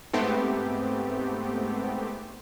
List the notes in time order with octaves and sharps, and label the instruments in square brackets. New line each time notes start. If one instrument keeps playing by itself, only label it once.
[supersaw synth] G#2 A3 B3 C4 G4